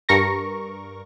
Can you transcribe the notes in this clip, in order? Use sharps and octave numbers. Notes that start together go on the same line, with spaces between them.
G2 A#4 C#6 A#6